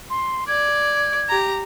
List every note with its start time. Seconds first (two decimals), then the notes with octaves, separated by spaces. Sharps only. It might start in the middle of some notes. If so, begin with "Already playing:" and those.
0.10 C6
0.48 D5 G#6
1.29 G4 A#5